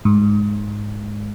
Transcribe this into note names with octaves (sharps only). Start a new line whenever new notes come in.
G#2